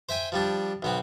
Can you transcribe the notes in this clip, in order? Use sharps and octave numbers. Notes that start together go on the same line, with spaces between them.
C5 E5 G5 G#5
F3 G3 D4
B1 B3 C4